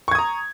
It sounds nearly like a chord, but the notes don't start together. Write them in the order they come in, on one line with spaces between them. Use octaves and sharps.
C#6 G#6 D#6 A#5